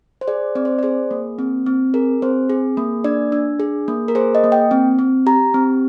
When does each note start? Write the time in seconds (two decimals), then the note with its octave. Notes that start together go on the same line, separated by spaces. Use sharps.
0.21 C5
0.28 G#4 D5
0.55 C4 D5
0.65 C5
0.79 D5
0.83 G#4 C5
1.11 A#3
1.39 C4
1.66 C4
1.94 G#4 A#4
2.22 C4 C5
2.50 G#4
2.77 A#3
3.04 D4 D5
3.32 D4
3.60 G#4
3.88 A#3
4.08 A#4
4.15 G#4 C5
4.35 D#5
4.44 A#3
4.52 G5
4.71 C4
4.99 C4
5.26 G4 A#5
5.54 C4